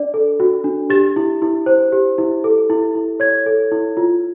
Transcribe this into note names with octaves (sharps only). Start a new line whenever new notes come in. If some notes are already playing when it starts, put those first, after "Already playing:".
Already playing: D4 D5
A4
F#4
D4
G4 A6
E4
E4
C5
G4
E4
A4
E4
E4
C#5 G#6
A4
E4
F4